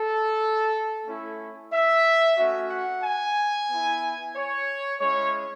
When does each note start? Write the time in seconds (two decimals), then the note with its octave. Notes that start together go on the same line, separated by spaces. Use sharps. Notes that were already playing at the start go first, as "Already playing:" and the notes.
Already playing: A4
1.06 A3 C#4 E4
1.72 E5
2.38 A3 C#4 F#4
2.70 F#5
3.03 G#5
3.70 B3 E4
4.35 C#5
5.00 G#3 C#4 E4 C#5